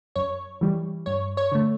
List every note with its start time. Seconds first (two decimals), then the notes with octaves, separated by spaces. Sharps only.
0.16 F#2 C#5
0.61 E3 G3
1.06 G2 C#5
1.37 C#5
1.52 D3 A3